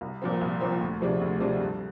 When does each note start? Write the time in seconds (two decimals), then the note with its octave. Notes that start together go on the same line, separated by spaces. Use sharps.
0.01 C2
0.22 A#2 F3 C4
0.41 C2
0.61 A#2 F3 C4
0.81 D2
1.01 C3 F3 G#3 D4
1.21 D2
1.40 C3 F3 G#3 D4
1.60 G2